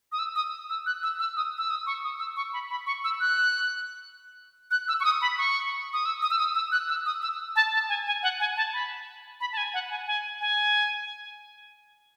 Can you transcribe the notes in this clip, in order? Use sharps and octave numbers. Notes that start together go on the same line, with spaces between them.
D#6
E6
D#6
E6
F#6
E6
E6
D#6
E6
D#6
C#6
D#6
E6
C#6
B5
B5
C#6
E6
F#6
F#6
E6
C#6
D#6
B5
C#6
D#6
E6
D#6
E6
D#6
E6
F#6
E6
D#6
E6
A5
A5
G#5
G#5
F#5
G#5
A5
B5
B5
A5
G#5
F#5
G#5
G#5
G#5